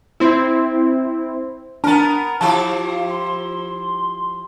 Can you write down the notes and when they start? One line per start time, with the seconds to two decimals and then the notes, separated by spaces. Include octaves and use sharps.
0.20 C4 E4
1.84 B3 D4 A#4 A5 A#5
2.41 F3 E4 G4 F5 A5
3.09 C6